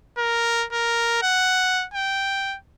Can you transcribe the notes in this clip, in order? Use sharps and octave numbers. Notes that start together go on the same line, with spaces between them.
A#4
A#4
F#5
G5